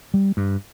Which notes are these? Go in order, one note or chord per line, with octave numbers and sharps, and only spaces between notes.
G3
G2